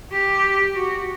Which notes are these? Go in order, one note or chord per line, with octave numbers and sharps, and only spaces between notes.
G4
F#4